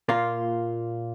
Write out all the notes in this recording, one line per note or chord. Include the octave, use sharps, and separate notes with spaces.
A#2 A#3 F4